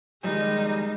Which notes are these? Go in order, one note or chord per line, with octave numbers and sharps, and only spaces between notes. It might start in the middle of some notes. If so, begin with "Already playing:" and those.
F2 D#3 G3 G#3 D#4